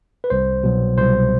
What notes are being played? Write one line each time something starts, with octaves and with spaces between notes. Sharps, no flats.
B4
C2 C5
B2 F#3
C2 C5